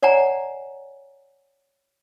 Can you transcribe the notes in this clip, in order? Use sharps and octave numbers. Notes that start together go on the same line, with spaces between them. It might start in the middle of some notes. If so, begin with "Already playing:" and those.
C#5 D5 F#5 G#5 A#5